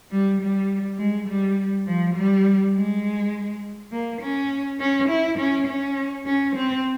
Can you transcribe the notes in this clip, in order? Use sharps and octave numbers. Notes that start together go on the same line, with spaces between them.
G3
G3
G#3
G3
F3
G3
G#3
A#3
C#4
C#4
E4
C#4
C#4
C#4
C4